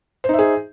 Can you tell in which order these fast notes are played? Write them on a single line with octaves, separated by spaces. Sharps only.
C5 D#4 E5 G#4